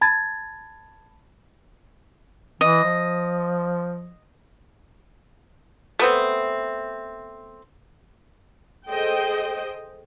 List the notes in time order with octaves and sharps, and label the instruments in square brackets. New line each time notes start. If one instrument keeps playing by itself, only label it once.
[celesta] A5 B5 G#6 A6
[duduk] E3 [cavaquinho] D#5
[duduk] F3
[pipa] A3 B3 C4
[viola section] G#4 A4 C5 D#5 G5